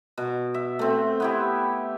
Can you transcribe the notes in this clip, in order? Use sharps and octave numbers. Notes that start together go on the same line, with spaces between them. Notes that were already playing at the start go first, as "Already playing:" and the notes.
B2
E5
A3 C4
B3 E4 G4